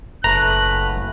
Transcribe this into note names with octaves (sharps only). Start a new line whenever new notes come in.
F#1 A3 B4 A#5 F#6